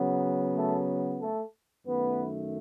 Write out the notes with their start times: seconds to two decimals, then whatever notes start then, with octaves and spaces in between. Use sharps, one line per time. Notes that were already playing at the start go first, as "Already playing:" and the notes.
Already playing: C#3 F#3 B3
0.55 A3 A4
1.21 A3 A4
1.86 F#2 D#3 A3 B3 B4